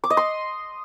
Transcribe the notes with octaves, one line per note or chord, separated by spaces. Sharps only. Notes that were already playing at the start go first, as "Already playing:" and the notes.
D6
D#5
C6